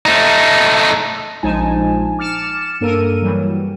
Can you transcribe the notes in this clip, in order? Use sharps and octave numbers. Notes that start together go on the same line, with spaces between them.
A3 D#4
A#1 F3 G#3 D#4 G#5 A5
D6 F6 A6 C#7 E7
G2 A#3 A4 A#4 D#7
E3 F#3 G3